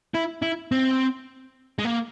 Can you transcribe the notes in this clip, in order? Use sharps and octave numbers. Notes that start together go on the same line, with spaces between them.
E4
E4
C4
G#3
A#3